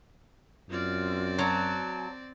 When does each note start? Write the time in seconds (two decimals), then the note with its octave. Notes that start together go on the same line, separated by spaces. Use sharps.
0.70 F#2 C4 F4 D5
1.39 F#3 A5